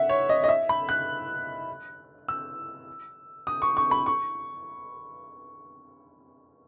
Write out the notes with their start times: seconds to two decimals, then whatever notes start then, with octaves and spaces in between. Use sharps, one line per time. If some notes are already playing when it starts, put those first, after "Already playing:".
Already playing: E5 F#5
0.09 C#5
0.29 D#5
0.44 D#5
0.49 E5
0.69 B5
0.89 F#6
2.28 E6
3.47 D#6
3.62 C#6
3.77 C#6
3.91 B5
4.06 C#6